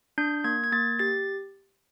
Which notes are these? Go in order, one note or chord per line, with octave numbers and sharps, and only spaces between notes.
D4 G6
A#3 G#6
G#6
A#3 A6
G4 A6